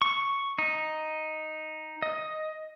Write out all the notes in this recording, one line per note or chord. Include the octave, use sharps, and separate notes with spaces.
C#6
D#4
D#5